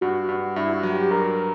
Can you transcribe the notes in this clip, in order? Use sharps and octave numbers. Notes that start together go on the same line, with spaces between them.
G2 F#4
G2
G2 E4
F#4
F#3
G4
G2 A#4